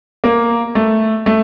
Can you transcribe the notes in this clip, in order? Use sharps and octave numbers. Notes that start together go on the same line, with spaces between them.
A#3
A3
A3